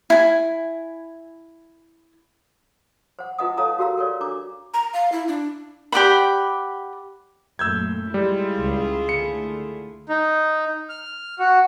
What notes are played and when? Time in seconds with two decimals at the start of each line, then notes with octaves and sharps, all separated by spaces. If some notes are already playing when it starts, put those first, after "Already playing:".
0.10 E4 G#5
3.19 C5 F#5
3.38 E4 F4 B4 D#5 F#5 D#6
3.58 D#4 A4 C#5 F5 A#5 D#6
3.79 F#4 G4 A#4 F5 A#5
3.98 A4 A#4 C#5 D5
4.21 D4 A#5 D6
4.74 A#5
4.93 F5
5.12 E4
5.28 D4
5.92 G4 D5 F#5 B5
7.59 F#2 A#2 A3 E6 G6 G#6
8.14 G3 G#3 E4 F4 G#4
8.57 C#2 C#3
9.09 D3 A3 C#7
10.09 D#4
10.89 F6
11.39 F#4